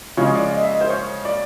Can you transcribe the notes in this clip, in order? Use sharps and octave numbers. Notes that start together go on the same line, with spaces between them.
C#3 F3 G#3 C#5
D5
D#5
E5
D#5
C5
C#5
D5